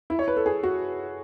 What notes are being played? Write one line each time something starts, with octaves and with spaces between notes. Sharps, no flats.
E4
C#5
B4
A4
G#4
F#4